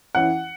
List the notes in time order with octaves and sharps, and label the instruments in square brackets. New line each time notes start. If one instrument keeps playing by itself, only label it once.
[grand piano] E3 C#4 E4 [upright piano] F#5